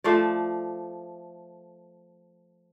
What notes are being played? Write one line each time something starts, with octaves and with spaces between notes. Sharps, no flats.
F3 A3 D5